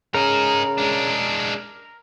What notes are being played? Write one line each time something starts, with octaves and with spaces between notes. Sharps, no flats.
C#3 D#4 G#4 A#4
G#3 D4